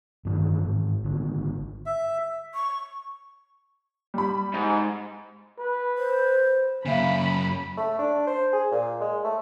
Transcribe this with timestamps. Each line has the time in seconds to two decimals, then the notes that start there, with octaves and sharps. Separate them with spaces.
0.25 G2 D#3 E3
0.65 G#1 G#2
1.04 G#1 D3
1.86 E5
2.54 C#6
4.14 G3 B5
4.54 G#2
5.59 B4
5.98 C5
6.86 F#2 C#3 A#3 E5 F5 B5
7.77 A3
7.99 D4
8.27 C5
8.53 G#4
8.71 A#2
9.01 G#3
9.24 A3